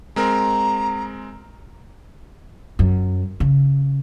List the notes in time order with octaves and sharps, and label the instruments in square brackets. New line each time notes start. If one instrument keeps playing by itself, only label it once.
[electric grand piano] G#3 C4 A#4 [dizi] A#5
[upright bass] F#2
C#3